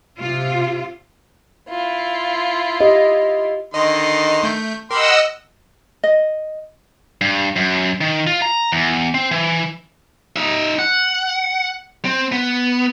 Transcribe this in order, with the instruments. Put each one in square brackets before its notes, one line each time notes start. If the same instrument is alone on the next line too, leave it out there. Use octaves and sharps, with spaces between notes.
[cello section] C3 F4
[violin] E4 F4
[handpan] G4 D#5
[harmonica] D3 D#3 C6 [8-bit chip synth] D#5
[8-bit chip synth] A3 G6
[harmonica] G4 C6 [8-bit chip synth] A#4 B5 [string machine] D#5 F#5 E6
[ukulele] D#5
[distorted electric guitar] G2
F#2
D#3
F4
A#5
E2
C4
E3
[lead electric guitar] D#4 E5
F#5
C4
B3